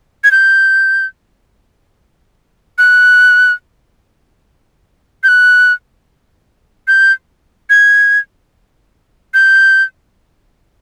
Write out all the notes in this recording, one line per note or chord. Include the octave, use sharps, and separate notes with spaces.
G#6
G6
F#6
G6
F#6
G6
G#6
G6